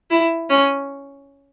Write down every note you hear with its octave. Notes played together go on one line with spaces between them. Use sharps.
E4
C#4